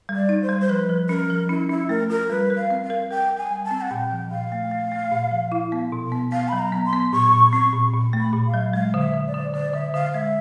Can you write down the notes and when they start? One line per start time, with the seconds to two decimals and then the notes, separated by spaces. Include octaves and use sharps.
0.09 G3
0.16 D5
0.29 D#4
0.42 C5
0.49 G3
0.61 C5
0.69 F3 B4
0.89 F3
1.09 C#4 A#4
1.30 F3
1.49 C#4 E4
1.69 C#4 E4
1.89 A3 A#4
2.10 F4 A#4
2.30 G3 B4
2.50 A#4
2.57 F5
2.71 C4
2.83 F5
2.90 A#4
3.10 A#4 G5
3.30 A#4
3.38 G#5
3.50 G3
3.64 A5
3.71 C4
3.81 F#5
3.91 A#2 G5
4.11 F3
4.31 A#2 F5
4.52 A3
4.71 A3
4.92 A3
5.11 A#2
5.31 F3
5.52 E4
5.72 B3
5.92 B2
6.12 B3
6.32 B3 F5
6.48 F#3 B5
6.59 A#5
6.72 B3
6.86 C6
6.93 B3
7.12 A#2 C#6
7.33 A#2
7.53 C4 C#6
7.73 A#2
7.93 A#2
8.13 A3
8.20 B5
8.33 A#2
8.46 F5
8.54 F#3
8.73 G#3 F5
8.94 D3
9.00 E5
9.14 D3
9.27 D5
9.34 D3
9.53 D3 D5
9.73 D3 E5
9.94 D3 F5
10.14 G#3 E5